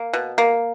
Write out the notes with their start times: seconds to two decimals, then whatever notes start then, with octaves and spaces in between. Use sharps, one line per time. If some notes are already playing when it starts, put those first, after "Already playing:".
Already playing: A#3
0.13 B2
0.38 A#3